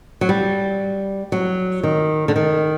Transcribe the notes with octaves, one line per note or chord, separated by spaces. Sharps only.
F#3
G3
F#3
D#3
D3
D#3